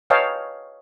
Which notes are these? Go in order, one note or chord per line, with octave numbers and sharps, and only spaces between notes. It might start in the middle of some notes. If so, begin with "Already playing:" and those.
B4 C#5 D#5 F5 G5 A5